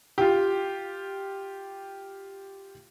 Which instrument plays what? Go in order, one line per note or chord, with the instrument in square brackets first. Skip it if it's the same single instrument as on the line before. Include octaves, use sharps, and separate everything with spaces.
[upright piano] F4 G4